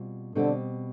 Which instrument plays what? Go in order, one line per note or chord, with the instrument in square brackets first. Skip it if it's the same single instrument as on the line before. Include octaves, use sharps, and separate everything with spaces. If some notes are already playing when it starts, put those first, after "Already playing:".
Already playing: [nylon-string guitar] B2 G3 C4 F4
[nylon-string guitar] B2 G3 C4 G4 [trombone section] D3